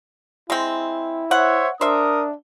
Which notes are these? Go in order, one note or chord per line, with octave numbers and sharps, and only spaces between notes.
G#3 C4 E4
C5 C#5 E5 F#5
D4 A#4 C5 E5 D#6